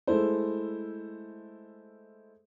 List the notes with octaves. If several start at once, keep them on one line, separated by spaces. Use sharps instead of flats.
G#3 A3 E4 C5